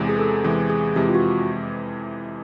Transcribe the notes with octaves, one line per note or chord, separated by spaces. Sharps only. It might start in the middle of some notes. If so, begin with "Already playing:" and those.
Already playing: E2 C3 E3 G#3
G#4
A4
E2 C3 E3 G#3 G#4
G#4
F2 C3 E3 G#3 G4
F4
F#4